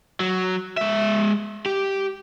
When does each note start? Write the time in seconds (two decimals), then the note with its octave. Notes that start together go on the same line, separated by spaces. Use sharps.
0.20 F#3
0.77 G#3 E5
1.66 G4